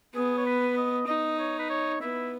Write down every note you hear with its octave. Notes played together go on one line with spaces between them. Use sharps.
B3 G#4
C#5
B4
D#5
D#4 D#5
C#5
B4
C#5
B3 E4